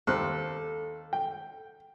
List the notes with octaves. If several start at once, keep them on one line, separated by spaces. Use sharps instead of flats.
D#2 C4 A4 F#6
G5